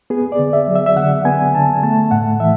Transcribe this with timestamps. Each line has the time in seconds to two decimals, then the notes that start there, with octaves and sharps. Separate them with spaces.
0.10 B3 G#4
0.32 D5
0.39 D3
0.53 E5
0.68 F#3
0.75 E5
0.86 E5
0.96 D3 F#5
1.25 B3 G#5
1.54 D3 A5
1.83 A3 A5
2.11 A2 F#5
2.40 E3 E5